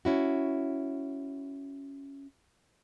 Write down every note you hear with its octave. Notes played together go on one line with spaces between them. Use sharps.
C#4 E4 F#4